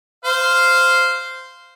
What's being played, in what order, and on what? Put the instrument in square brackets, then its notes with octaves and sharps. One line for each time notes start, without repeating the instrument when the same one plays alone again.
[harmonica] C5 F5